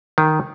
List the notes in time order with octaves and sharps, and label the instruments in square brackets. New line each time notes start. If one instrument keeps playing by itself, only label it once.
[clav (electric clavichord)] D#3